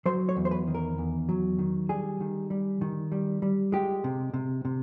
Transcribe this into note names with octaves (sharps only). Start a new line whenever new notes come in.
F#3 C5
C#5
E2
C5
B4
D#3
A#4
E2
F#3
D#3
G3 G#4
D#3
G3
D#3
G3
G3
G#3 G4
C3
C3
C3